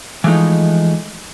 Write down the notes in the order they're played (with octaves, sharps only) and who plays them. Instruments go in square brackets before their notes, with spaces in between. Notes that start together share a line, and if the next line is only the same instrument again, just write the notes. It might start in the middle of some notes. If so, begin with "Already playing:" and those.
[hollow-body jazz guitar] E3 F3 G#3 A3 D#4